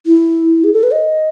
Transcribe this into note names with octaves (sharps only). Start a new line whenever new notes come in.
E4
G#4
A4
B4
D#5